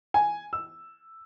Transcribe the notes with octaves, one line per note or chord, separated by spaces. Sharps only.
G#5
E6